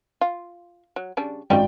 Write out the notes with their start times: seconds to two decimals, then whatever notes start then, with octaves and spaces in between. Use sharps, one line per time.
0.21 F4
0.96 F#3
1.17 C#3 G3 D4
1.50 G#1 G3 C#4 D5 D#5 G5